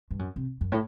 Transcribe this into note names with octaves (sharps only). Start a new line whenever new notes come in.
G2
F#2
C3
F#2
A2